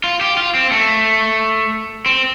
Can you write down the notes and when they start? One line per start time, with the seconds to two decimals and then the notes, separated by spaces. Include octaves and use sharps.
0.04 F4
0.21 G4
0.37 F4
0.55 C4
0.71 A3
2.06 C4